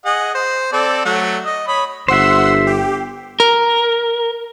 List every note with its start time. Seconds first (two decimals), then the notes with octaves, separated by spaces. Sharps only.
0.06 G#4 D#5 F#5
0.34 C5
0.73 C4 A4 D5
1.05 F#3 A3 F#5
1.45 D#5
1.68 C#5 B5 D#6
2.08 G1 C5 E5 F#5 C6 E6
2.67 G4
3.40 A#4